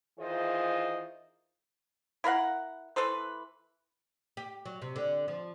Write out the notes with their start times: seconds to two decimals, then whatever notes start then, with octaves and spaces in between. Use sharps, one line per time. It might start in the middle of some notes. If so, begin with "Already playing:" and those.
0.19 D#3 E3 F4 G#4 C5 D#5
2.24 E4 A#4 F5 F#5
2.96 E3 A4 B4 C5
4.37 G4
4.65 F#3
4.82 C3
4.96 D3
5.28 F3